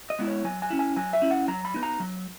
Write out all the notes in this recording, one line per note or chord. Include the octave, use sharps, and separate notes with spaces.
D#5
G#3 B3 E4
C#5
F#3 G#5
G#5
C#4 E4
G#5
F#3 G#5
E5
C#4 E4
F#5
F#3 A#5
B5
B3 D#4
A#5
F#3